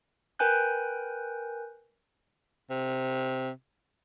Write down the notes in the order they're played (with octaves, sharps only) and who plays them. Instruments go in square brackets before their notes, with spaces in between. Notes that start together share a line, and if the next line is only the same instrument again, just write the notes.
[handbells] A#4 B4 G5 G#5 F#6 G6
[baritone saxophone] C3